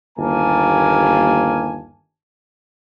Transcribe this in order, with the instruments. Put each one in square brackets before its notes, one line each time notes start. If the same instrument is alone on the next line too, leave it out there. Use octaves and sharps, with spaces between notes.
[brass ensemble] G1 D#2 A#3 G#5 A5